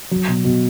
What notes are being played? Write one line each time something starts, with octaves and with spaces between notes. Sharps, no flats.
F#3
B2
B2